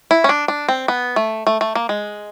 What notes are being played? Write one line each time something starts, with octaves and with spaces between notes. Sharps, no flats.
E4
C#4
D4
D4
C4
B3
A3
A3
A3
A#3
G#3